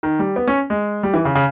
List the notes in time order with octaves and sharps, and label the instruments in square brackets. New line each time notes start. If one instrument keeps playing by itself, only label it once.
[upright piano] D#3
G3
B3
C#4
G#3
G3
E3
C#3
C#3